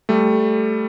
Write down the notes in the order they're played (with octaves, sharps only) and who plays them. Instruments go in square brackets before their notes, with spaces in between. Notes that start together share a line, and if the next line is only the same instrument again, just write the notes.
[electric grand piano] G3 A3